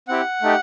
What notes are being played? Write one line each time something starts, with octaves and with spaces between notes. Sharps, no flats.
C4 E4 G4 F#5
A3 D#4 G4